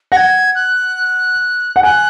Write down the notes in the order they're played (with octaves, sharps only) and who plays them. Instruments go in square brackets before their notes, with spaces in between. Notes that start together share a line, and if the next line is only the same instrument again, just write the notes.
[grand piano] F#5 [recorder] G#6 A#6
[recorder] F#6
[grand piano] F#5
[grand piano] G#5 [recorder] F#6